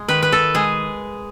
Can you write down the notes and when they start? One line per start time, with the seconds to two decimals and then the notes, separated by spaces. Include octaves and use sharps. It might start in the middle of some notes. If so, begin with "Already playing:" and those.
Already playing: G#3
0.08 D#3 B4
0.22 B4
0.32 A4
0.55 G#3 G#4